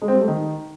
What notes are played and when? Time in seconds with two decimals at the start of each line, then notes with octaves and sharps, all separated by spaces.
0.02 G#3
0.08 C4
0.15 G3
0.21 A3
0.28 D#3